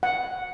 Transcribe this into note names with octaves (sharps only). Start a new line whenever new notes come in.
F#5